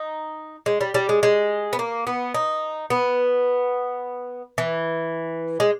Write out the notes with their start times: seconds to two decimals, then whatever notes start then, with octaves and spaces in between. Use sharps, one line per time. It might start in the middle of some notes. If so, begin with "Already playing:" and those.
Already playing: D#4
0.66 G#3
0.81 G3
0.94 G3
1.09 G#3
1.23 G#3
1.73 B3
1.79 A#3
2.07 B3
2.34 D#4
2.90 B3
4.58 E3
5.60 G#3